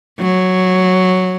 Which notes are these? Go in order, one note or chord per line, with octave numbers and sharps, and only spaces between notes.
F#3